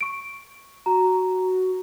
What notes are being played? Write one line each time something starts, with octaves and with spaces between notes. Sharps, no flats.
C#6 D7
F#4 A#5